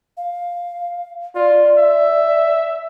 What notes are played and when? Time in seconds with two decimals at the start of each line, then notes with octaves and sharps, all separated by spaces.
0.17 F5
1.35 F4 D5
1.78 E5